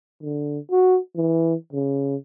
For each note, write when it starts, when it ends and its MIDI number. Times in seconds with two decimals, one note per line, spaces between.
0.22 0.59 50
0.71 0.99 66
1.16 1.55 52
1.73 2.16 49